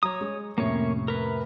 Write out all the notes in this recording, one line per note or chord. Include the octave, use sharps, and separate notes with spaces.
F#3 C#5 A#5 D#6
G#3
F2 A2 C3 A#3 C#4 C#5
A#4 B4